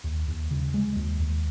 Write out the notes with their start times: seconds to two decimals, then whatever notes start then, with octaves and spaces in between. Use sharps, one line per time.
0.04 D#2
0.28 D#2
0.51 C#3
0.74 G#3
0.96 D#2
1.20 D#2